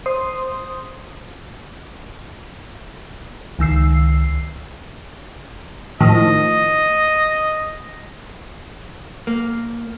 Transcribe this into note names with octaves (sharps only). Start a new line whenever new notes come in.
C5 C6 D#6
C#2 D#3 E6 C7
A2 D#3 F3 D#5
A#3